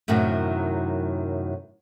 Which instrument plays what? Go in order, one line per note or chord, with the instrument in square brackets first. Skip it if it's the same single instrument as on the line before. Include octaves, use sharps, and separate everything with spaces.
[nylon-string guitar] F#2 A2 C3 D#3 F#3